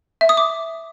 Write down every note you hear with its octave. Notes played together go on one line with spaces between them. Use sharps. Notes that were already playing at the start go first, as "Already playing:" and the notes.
E5
D#6
D6